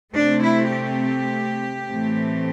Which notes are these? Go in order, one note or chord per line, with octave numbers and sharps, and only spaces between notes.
C3 A3 C4 D4
E4
G4
A2 E3 A3 C4